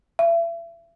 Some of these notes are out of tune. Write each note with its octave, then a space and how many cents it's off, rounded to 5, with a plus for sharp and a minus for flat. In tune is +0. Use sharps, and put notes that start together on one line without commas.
E5 +35